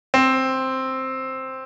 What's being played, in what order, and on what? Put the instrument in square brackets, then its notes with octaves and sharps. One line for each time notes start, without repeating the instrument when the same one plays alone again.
[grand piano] C4